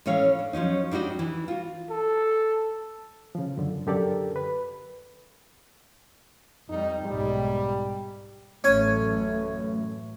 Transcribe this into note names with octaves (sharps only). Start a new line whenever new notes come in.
A2 E3 C#4 C#5 F5
D4
F3 F#3 C#4 D#4
G3 D4 D#4 F#4 D#5
E3
F4 F#4
A4
C#3 F3
F#2 D3
F#2 D3 G4 A4 A#4 D5
B4
F2 G3 D#4
B1 G#2 G3
A1 F#2 A2 A3 C#4 G#5